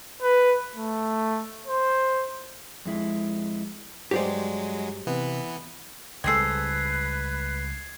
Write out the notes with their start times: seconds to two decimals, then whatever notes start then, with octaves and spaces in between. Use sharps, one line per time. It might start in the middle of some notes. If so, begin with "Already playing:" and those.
0.22 B4
0.75 A3
1.67 C5
2.85 F2 G#3 E4
4.11 G2 F#3 G#3 G4 C5 D5
5.07 C3 E3 B3
6.24 C#2 G3 C4 G#4 A4 B4 G#6 C7